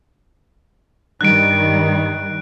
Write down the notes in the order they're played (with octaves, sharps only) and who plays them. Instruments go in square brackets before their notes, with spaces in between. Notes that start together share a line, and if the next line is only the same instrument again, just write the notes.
[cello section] G2 D#3 G3 [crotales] F#6 D7